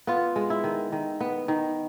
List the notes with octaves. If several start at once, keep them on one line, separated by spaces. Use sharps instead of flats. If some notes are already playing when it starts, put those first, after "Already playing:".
B3 F4
G#3
E4
D#3
D#3
B3
D#3